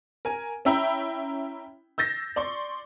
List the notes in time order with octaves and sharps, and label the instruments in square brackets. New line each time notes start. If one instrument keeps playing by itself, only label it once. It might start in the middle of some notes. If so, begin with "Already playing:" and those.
[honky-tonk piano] A#4 G#5
C#4 E4 E5 G5 A#5 B5
E6 G6 A6 A#6 C7
D5 C6 C#6